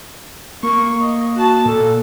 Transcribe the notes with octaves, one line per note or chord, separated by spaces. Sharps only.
A#3 C#6
D#5
F#4 A5
A#2 A4